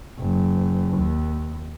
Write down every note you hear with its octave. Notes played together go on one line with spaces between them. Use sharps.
F#1
D#2